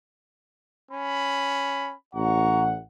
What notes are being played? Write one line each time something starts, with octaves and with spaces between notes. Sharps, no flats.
C#4 B5
A1 F#5 A#5 C#6